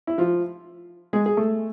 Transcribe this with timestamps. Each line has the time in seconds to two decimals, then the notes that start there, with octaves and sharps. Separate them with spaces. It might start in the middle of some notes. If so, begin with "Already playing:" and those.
0.07 E4
0.18 F3 F4
1.13 G#3 G#4
1.26 G#4
1.37 A3 A4